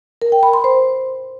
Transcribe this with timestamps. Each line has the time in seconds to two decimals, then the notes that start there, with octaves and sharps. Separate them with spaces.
0.22 A#4
0.32 G5
0.43 B5
0.53 C6
0.64 C5